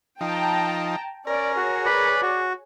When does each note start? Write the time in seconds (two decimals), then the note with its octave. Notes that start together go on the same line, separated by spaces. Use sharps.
0.21 F3 D#4 G5 A5 A#5
1.27 C#4 A#4 D5
1.57 F#4 G#4 C#5
1.86 B4 D5 B5
2.22 F#4